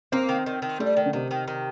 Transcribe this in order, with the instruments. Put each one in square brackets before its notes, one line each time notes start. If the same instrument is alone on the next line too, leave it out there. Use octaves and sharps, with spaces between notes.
[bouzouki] A#3 [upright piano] C4
[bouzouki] D#3
D#3
D#3
[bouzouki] G3 [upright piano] A3
[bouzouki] D#3
[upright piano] D3
[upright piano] C3 [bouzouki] D#3
[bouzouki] D#3
D#3